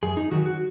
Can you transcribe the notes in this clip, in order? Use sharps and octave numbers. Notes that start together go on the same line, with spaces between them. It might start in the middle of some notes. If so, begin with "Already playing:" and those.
F#2 G#4
D#4
D#3 F#3 F#4
F#4